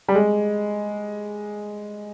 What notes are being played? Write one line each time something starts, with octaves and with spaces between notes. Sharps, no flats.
G3
G#3